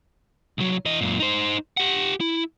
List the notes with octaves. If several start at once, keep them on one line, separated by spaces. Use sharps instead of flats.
C2 F#3
E3 D#5
F#2 A#2
D#4 C5
G4 F#5
E4